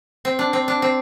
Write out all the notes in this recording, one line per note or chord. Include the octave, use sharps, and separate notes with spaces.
C4
D4
C4
D4
C4